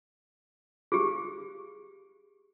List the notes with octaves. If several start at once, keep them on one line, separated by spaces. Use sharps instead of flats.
G4 G#4